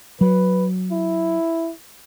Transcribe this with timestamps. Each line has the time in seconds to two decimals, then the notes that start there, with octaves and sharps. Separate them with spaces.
0.21 F#3 B4
0.92 E4